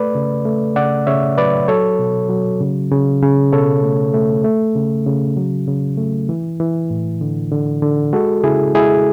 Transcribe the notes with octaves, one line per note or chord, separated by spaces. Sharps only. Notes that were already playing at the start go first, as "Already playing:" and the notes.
Already playing: A3 B4 D5
C#3
A3
C#3 D5 F#5
C#3 C#5 E5
F#3 B4 D5
F#3 A4 C#5
B2
F#3
C#3
C#3
C#3
B2 A4 C#5
A3
A3
A3
C#3
C#3
F#3
C#3
A3
E3
E3
A2
D3
D3
D3
G#3 F#4 A4
C#3 E4 G#4
G#3 E4 G#4